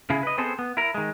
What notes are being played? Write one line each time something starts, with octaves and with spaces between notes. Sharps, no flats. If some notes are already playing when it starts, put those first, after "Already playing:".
C#3 E4 G#4
B4 D#5
B3 C4 G#4 A4 C5
B3
E4 A#4
D#3 G#3